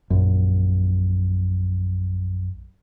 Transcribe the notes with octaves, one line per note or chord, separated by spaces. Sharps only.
A#1 F#2